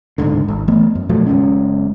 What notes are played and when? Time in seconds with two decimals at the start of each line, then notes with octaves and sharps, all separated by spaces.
0.18 D1 C#2 G#2 D3
0.48 G#1
0.68 E3 A3 B3
0.95 F#2
1.09 B2 F3 F#3 A3
1.26 F#1 G2 G#3 C#4